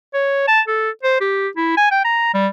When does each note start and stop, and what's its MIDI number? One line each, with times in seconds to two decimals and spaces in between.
0.14 0.45 73
0.48 0.61 81
0.67 0.90 69
1.03 1.20 72
1.21 1.48 67
1.56 1.75 64
1.77 1.87 80
1.91 2.01 79
2.05 2.33 82
2.34 2.48 55